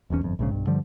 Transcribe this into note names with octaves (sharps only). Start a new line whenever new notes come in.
E1 B1 E2 C#4
G1 F2
A#1 G#2 C#3
B1 G2
G2 D3 F3 G3